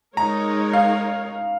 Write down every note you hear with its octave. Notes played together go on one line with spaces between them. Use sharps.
G#3 D#4 A#4 C#5 A#5
F5